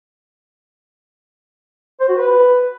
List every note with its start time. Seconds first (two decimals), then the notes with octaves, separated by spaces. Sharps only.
2.00 C5
2.09 F#4
2.17 B4